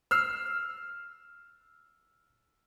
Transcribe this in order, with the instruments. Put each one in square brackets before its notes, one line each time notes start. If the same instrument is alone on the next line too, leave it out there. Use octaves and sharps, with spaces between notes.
[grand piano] E6 F6 C7